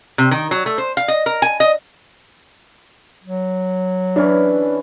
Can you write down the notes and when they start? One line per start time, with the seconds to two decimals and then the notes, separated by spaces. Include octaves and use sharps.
0.18 C3
0.31 D#3
0.51 F#3
0.66 A3
0.78 C5
0.97 F5
1.08 D#5
1.26 A#4
1.42 G#5
1.60 D#5
3.24 F#3
4.16 E3 C#4 D4